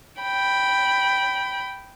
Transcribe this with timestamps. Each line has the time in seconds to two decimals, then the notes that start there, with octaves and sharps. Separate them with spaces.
0.21 G5 B5